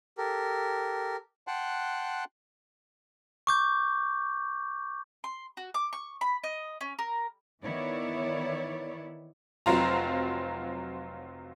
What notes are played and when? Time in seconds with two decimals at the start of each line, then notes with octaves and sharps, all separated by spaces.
0.17 G4 A4 A#4
1.47 F#5 G5 A5 C6 F#6
3.47 C#6 D6 G6
5.24 C6
5.57 F#4
5.74 D6
5.93 C#6
6.21 B5
6.44 D#5
6.81 C#4
6.99 A#4
7.63 D#3 E3 B3 E4 C#5 D5
9.66 F1 F#3 C4 F4 A#5